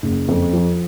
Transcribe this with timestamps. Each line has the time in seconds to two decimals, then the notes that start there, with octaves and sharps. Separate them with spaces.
0.03 F#1
0.28 F2
0.53 F3